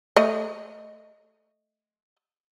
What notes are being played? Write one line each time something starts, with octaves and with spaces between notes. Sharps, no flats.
A3 D#5